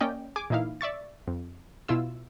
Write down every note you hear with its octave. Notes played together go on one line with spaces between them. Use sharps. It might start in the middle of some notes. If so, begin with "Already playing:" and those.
A#3 C#4 D5 D#5 G5
G#4 G#5 D6
A#2 E3 D#4 E4 F5
D5 E5 C#6 A6
F2
B2 E4 F4 E6